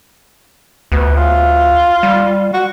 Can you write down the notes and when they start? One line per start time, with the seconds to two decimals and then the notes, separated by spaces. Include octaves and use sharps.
0.92 D2 B3
1.17 F4
2.03 G3
2.53 F#4